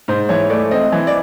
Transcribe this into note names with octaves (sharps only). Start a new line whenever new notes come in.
G#2 C5
E3 C#5
A3 D5
C4 D#5
E3
D5